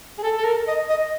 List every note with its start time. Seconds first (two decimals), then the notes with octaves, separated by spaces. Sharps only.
0.18 G#4
0.23 A4
0.38 A4
0.44 A#4
0.67 D#5
0.89 D#5